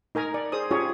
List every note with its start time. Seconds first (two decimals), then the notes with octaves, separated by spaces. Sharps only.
0.15 D#4 A#4 G#5 A#5
0.34 D5
0.52 G#4 C5 D#6
0.71 C#4 F4 G4 G#4 C#5